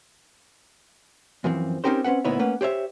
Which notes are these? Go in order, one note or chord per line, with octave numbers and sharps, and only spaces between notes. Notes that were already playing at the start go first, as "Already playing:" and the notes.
F#2 E3 F3 C4
C4 C#4 D#4 G4 A#4 C5
C4 C#4 B4 F#5
D2 A#2 B3 D#4 E4 C#5
A3 A#3 C#4 B4 F#5
G4 C5 C#5 E5